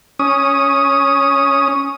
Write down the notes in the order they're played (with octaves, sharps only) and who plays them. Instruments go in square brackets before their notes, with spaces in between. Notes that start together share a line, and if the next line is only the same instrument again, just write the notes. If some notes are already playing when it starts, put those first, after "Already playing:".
[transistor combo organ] C#4 D#6